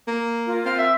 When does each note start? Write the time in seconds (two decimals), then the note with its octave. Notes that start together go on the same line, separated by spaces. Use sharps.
0.08 A#3
0.46 F4 A#4
0.65 C4 F5
0.78 E5